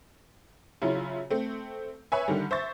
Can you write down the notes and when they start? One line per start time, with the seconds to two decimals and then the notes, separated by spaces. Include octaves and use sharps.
0.82 C#3 F#3 E4 F4
1.30 A3 C4
2.12 B4 C#5 E5 G#5
2.28 D3 D#3 G3
2.51 C5 E5 C#6 A6